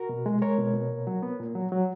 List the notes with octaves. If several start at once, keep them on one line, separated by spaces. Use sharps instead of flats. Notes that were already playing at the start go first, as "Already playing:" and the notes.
Already playing: F#4 A#4
B2
G#3
G#3 A#4 C#5
B2
B2
A#2
F#3
B3
A#2
F#3
F#3